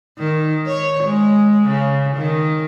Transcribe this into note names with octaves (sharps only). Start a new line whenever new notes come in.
D#3
C#5
G#3
C#3
D#3